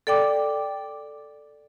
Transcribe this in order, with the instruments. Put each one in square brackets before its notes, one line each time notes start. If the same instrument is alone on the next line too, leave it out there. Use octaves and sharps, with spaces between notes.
[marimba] A4 D5 G5 D6